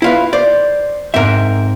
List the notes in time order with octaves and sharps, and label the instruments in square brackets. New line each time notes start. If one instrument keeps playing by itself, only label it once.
[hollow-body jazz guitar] E4 F4 B4
[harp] C5 [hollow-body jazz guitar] D5
[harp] G#2 C4 [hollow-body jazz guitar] A#4 E5